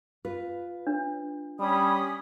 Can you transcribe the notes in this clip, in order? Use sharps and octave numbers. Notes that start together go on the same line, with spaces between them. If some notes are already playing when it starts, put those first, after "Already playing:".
F4 B4
D4
G3 C#4 B5 D#6